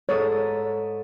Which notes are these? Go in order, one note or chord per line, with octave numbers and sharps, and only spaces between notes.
G#2 A4 C#5 D#6